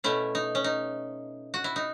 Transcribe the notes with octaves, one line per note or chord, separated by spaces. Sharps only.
B2 A3 C#4 E4
D#4
C#4
D#4
F#4
E4
D#4